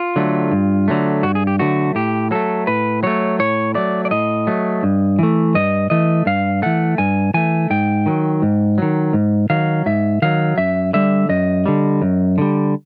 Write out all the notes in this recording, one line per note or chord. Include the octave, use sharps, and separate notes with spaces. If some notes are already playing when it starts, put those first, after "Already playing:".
Already playing: F4
D3 F#3 A3
G2
D3 F#3 A3
G2 F#4
G#4
G4
D3 F#3 A3 F#4
A2 G4
F#3 A3 A4
A2 B4
F#3 A3 C#5
A2 C#5
F#3 A3 D5
D5
A2 D#5
F#3 A3
G2
E3 A3
G2 D#5
E3 A3 D#5
G2 F5
E3 A3 F#5
G2 G#5
E3 A3 G#5
G#2 G5
D#3 F#3
G#2
D#3 F#3
G#2
D#3 F#3 F5
G#2 E5
D#3 F#3 F5
F#2 E5
D3 G3 E5
F#2 D#5
D3 G3
F#2
D3 G3